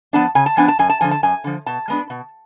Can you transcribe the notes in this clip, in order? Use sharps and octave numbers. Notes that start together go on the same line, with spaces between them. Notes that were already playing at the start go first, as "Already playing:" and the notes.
F3 B3 D4 A5
C#3 G#5
A5
F3 B3 D4 G#5
A5
F#2 G#5
A5
D3 F3 G#5
A5
F#2 G#5
D3 F3
B2 A5
G#3 B3 D4
B2